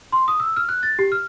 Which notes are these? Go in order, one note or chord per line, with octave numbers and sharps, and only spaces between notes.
C6
D#6
E6
F6
F#6
A6
G4
F6